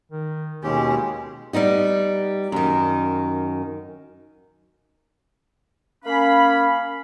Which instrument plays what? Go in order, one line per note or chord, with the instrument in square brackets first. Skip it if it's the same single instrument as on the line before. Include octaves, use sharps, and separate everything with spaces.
[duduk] D#3
[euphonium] D#2 [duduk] B2 [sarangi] G#3 [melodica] C#4 G4
[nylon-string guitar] G3 B3 D#4 G4
F#2 D#3
[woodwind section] A#3 C#4 F5 B5